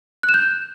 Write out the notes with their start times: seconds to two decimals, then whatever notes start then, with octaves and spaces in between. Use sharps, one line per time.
0.23 F#6
0.29 E7
0.34 G6